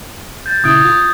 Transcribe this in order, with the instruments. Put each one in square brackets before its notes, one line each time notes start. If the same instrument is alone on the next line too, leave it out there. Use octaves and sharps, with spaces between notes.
[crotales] G6 A6
[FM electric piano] A#2 C#3 E4 [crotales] D#6 G#6 D7
[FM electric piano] F4